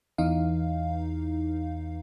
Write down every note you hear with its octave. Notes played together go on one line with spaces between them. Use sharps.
E2 E3 D#4 F5